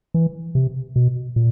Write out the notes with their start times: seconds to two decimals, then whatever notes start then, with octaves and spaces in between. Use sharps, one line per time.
0.14 E3
0.55 C3
0.96 B2
1.36 A#2